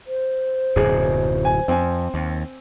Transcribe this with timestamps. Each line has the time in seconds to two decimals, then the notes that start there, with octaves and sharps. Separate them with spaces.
0.07 C5
0.76 D1 F#2 B2 G#4
1.45 G#5
1.68 F2 C4 G#5
2.14 D#2